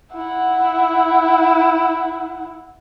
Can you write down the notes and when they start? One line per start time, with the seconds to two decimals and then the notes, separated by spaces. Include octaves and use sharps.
0.13 E4 F#5